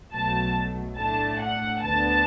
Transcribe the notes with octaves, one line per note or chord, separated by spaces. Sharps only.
B1 B2 F#3 A3 A5
A2 A3 D4 A5
F#5
D2 D3 B3 D4 A5